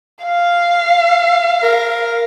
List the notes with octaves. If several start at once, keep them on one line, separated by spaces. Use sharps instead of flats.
F5
A#4